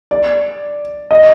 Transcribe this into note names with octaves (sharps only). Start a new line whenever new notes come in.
D5
D#5